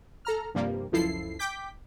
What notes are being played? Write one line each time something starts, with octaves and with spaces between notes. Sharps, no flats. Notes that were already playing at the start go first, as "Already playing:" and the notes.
A4 A#5 F6
G2 C3 F3 G3 A#3
C#2 F#2 F3 E4 A4 C7
G5 D6 G6 B6